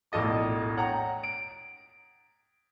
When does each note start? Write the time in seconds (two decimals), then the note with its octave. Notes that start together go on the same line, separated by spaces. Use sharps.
0.12 E1 A#1 A2 A4 D#5 D6
0.77 C#5 F#5 G5 A#5
1.23 D7